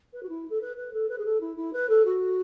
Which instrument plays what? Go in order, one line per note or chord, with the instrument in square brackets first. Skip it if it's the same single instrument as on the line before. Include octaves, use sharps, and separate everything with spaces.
[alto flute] B4
F#4
E4
A4
B4
B4
A4
B4
G#4
A4
E4
E4
B4
A4
F#4